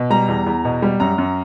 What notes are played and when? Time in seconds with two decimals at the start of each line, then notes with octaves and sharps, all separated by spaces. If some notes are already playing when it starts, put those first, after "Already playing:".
Already playing: B2
0.10 G3 A#5
0.28 E2
0.46 E2
0.65 B2
0.82 G3
1.00 F#2 A#5
1.18 F#2